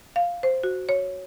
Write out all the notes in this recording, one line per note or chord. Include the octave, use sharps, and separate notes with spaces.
F5
C5
F#4
C#5